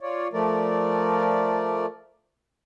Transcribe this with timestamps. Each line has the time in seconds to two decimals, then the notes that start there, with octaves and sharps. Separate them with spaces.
0.01 F4 C#5 D5
0.33 F3 A3 A#4 D5